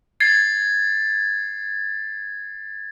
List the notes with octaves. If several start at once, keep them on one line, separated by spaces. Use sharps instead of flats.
G#6 A6 C7